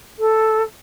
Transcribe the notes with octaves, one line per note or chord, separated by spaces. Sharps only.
A4